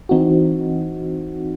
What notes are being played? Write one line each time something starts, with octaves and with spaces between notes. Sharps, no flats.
E3 C4 D#4 F#4